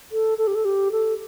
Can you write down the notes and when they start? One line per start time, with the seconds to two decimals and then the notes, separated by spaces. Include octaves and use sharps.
0.12 A4
0.38 A4
0.47 G4
0.55 A4
0.65 G4
0.92 A4